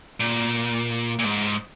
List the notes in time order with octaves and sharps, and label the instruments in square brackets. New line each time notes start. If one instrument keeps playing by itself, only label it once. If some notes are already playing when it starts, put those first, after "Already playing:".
[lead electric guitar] A#2
A#2
G#2